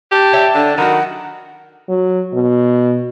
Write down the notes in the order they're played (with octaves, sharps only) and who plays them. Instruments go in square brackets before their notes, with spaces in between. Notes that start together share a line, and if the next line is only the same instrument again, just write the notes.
[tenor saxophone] G4 [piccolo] A5
[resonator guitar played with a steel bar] C#5 E5 G5
[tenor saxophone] D3 [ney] D4
[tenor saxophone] D#3 [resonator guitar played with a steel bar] F#3 F#4 [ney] F#5 [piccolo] B5
[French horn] F#3
B2